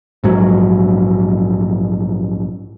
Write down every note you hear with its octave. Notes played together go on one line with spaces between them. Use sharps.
A#1 G#2 F#3